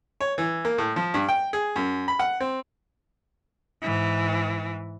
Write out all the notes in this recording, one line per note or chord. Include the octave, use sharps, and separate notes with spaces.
C#5
E3
A#3
A2
F3
G2
G5
G#4
F#2
B5
F#5
C4
G#2 E3